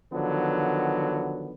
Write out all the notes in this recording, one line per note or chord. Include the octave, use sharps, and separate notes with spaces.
D3 D#3 F3 F#3 B3